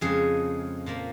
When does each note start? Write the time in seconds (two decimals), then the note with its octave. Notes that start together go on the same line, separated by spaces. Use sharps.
0.01 F2 C#3 F3 G#3 G#4
0.86 A#2 F3 A#3